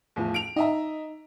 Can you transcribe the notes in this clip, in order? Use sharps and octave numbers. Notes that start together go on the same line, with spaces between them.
E2 A2 F3
D7 F7
D#4 D#5 E5 A#5